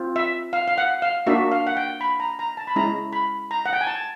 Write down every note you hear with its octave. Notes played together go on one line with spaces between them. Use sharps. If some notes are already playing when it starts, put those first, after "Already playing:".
Already playing: C4 F4
E5
F5
F5
F#5
F5
A#3 D4 F#4 E5
F5
F#5
G5
B5
A#5
A#5
A5
B5
G#3 C#4 E4 A#5
B5
A#5
F#5
G5
G#5
A5